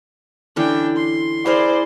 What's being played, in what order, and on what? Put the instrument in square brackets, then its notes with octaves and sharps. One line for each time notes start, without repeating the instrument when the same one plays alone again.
[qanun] D3 E3 C#4 [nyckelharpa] D4 G5
[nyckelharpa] C6
[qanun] E4 G#4 A#4 [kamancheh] C5 D5